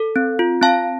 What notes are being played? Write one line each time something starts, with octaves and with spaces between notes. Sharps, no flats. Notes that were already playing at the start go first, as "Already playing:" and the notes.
Already playing: A4
C4
F4
C4 F5 A5